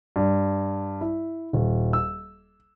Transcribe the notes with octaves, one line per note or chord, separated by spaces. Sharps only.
G2
E4
D#1
E6